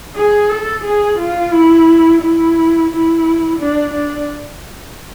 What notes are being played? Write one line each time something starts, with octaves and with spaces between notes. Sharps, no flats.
G#4
A4
G#4
F4
E4
E4
E4
D4
D4